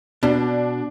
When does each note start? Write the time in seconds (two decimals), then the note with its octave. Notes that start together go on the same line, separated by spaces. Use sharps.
0.23 B2 D4